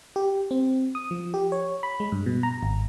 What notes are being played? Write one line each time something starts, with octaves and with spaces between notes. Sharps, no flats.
G4
C4
D#6
F3
G4
C#5
B5
G#3
G2
B2
A#5
G#1